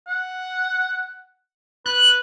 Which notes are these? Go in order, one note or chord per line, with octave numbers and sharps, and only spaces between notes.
F#5
B4 F#6